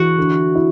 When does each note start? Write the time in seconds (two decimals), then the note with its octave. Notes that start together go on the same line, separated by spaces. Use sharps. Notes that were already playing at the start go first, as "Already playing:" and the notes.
Already playing: E3 F#4
0.18 D3
0.55 E4